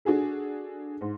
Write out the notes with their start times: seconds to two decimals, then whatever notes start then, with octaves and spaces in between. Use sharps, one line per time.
0.05 D4 F#4 G#4 A4
1.01 G#2